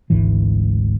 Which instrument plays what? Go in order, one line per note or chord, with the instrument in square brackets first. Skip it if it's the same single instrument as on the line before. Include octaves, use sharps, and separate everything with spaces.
[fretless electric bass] G#1 D2 G#2 E3